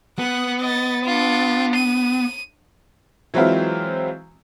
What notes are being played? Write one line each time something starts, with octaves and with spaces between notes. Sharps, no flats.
B3 F#5
D#5 A6
D4 F4
D#7
E3 F#3 G#3 C4 E4 F4